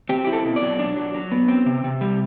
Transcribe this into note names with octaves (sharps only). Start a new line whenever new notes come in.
C4 G4
E4 G4
A4
B2
D5
F#3
D4
F#3
F#3
B3
C4
C3
C3
G3